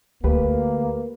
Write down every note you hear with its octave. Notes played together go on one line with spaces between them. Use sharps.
D2 A3 A#3 G4 B4